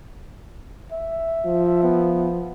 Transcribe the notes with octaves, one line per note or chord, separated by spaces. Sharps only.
E5
F3
B3